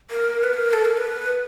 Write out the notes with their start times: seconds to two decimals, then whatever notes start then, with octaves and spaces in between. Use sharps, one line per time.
0.10 A#4
0.43 B4
0.54 A#4
0.73 A4
0.85 A#4
0.97 B4